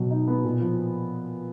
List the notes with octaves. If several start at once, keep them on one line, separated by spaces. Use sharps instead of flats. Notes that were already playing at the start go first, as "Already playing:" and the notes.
Already playing: B2 F#3
D#4
B3
A#2
F3